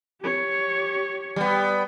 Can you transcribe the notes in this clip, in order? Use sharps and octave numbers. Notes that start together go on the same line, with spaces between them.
G4 C#5
G3 B3